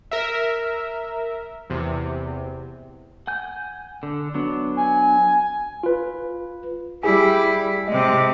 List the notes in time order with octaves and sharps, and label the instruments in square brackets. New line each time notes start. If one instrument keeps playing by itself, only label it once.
[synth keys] A#4 E5
E2 C3
[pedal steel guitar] F#5 G#5 G6
D3
F#3 B3 D4
[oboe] G#5
[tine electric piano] F4 B4
[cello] G3 E4 [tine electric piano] G4 G#4 G#5
[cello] C3 G#3 [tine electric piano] D#5